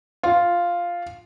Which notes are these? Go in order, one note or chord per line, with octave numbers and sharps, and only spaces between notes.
F4